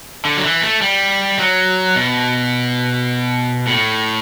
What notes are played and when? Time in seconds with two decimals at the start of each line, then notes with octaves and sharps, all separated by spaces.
0.25 D3
0.37 F#3
0.44 E3
0.63 A3
0.82 G3
1.39 F#3
1.96 B2
3.67 A2